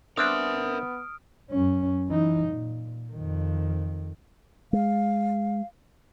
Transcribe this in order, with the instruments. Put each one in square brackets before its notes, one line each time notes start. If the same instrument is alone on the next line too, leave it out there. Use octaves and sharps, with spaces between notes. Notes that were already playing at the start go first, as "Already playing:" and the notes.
[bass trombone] B3 [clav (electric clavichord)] C4 D4 [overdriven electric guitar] A#4 E5 [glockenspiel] D#6 F6 D7
[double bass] F#2 C#4
E3 D#4
A#2
F2 D#3
[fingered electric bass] G#3 [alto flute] F5